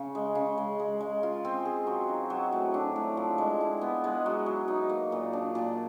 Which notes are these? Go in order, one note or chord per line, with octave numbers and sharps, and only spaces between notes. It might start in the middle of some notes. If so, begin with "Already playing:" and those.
Already playing: C#3
G#3
C#3
G#3
G#3
G#3
F4
C4
G#4
F#3
D#4
F#3
A2
D4
A2
F3
G#3
E4
B3
G#3
F#3
F#3
D#4
A#3
A#2
D4
A#2